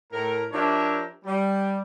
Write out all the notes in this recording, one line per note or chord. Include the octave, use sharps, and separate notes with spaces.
A2 A#4
F3 D4 G4 A#4 C#5 E5
G3